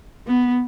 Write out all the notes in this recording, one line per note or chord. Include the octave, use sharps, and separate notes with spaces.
B3